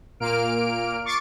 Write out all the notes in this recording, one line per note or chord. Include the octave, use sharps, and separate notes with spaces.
A#2 A#3 F6 D7
C#6 D6 A6 C7 D7